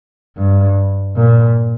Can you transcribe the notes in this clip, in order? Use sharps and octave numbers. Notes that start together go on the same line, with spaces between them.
G2
A#2